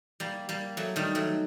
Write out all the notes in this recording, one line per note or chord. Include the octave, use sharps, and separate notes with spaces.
G3 A#3
G3 A#3
F#3 A3
D#3 G3
F#3 A3